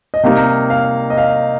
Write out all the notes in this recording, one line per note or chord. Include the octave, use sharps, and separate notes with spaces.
D#5
C3 G3 A#3 D#4 F5
F5
D#5
F5